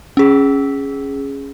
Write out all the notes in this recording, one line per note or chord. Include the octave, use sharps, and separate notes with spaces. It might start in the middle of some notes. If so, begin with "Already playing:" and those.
C#4 G#4